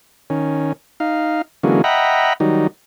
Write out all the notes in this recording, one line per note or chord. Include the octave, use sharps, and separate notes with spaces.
D#3 C#4
D#4 F5
D3 E3 F#3 G#3 A#3 C#4
D#5 E5 F#5 G5 A#5 B5
D#3 F#3 G3 D#4